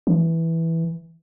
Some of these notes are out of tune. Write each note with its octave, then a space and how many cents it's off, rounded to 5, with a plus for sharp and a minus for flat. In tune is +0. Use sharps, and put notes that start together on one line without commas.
E3 -5